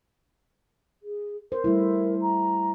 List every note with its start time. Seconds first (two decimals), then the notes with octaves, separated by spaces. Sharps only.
1.03 G#4
1.52 A#4 C5
1.64 G3 A3 E4
2.21 A#5